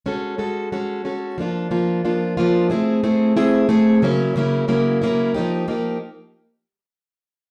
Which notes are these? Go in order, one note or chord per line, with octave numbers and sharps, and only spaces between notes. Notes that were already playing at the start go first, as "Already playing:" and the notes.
G#3 C#4 F#4 A4
G#3 C#4 F#4 A4
G#3 C#4 F#4 A4
G#3 C#4 F#4 A4
F3 A#3 D4 F4
F3 A#3 D4 F4
F3 A#3 D4 F4
F3 A#3 D4 F4
A3 C4 E4 G#4
A3 C4 E4 G#4
A3 C4 E4 G#4
A3 C4 E4 G#4
C#3 F#3 A#3 C#4 E4
C#3 F#3 A#3 C#4 E4
C#3 F#3 A#3 C#4 E4
C#3 F#3 A#3 C#4 E4
F3 A#3 D#4 G4
F3 A#3 D#4 G4